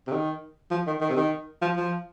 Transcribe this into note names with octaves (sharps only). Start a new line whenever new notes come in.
C3
D#3
F3
D#3
D#3
C3
D#3
F3
F3